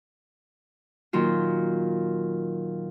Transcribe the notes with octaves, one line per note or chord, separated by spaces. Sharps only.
A#2 D#3 F#3 F4